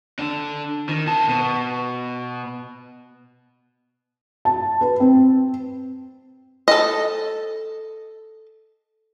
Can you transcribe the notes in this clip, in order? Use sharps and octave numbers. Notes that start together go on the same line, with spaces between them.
D3 D4
D#3
D#3 A5
B2
A5
B4
C4
A4 D#5